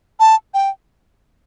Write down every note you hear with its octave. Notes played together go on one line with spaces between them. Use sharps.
A5
G5